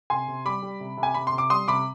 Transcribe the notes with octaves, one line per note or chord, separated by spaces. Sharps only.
C3 G#5 C6
C3
G3 B5 D6
G3
C3
C3
G#5
C3 B5
C6
C3
D6
G3 C6 D#6
C3 B5 D6